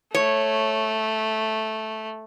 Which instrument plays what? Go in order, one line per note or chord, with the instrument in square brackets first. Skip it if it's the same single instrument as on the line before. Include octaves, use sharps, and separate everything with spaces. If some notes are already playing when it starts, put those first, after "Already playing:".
[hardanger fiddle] A3 [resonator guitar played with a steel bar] C#5